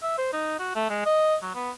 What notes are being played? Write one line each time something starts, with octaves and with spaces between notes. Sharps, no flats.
E5
C5
D#4
F#4
A3
G#3
D#5
F#3
B3